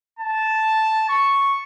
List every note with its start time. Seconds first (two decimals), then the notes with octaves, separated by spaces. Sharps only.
0.19 A5
1.09 C#6